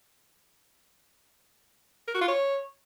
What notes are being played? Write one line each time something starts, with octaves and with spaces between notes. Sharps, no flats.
A#4
F#4
F4
C#5